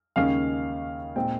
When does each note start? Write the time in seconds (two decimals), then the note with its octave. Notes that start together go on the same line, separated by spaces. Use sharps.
0.16 D#2 C#3 G#3 C#4 F5
1.16 A#2 G#3 C4 G5